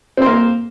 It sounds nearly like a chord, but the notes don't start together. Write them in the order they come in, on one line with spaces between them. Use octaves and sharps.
C4 C5 A#3